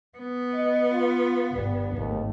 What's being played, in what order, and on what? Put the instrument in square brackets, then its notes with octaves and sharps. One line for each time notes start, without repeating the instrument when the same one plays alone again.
[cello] B3
[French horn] D#5
F4
[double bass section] G1 [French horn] G3
[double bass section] G#1 A3 [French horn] D#2